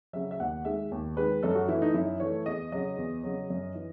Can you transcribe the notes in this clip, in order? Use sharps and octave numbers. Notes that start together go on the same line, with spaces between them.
C#3 F#3 E5
E5
D#2 F#5
D#3 G#3 E5
D#2
D#3 G#3 B4
F#2 A4
F#4
E3 A3 E4
D#4
F#2 E4
E3 A3 C#5
E2 D#5
C#3 F#3 D#5
E2
C#3 F#3
F#2
E3